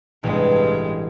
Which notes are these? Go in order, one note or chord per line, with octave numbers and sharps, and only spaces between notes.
A1 G2 C3 G#3